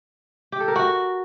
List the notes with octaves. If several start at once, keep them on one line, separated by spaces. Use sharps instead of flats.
G4
A4
A#4
F#4